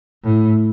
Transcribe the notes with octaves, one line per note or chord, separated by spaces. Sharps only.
A2